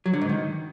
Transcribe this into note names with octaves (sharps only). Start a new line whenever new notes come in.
F#3
D3
G#2
D#3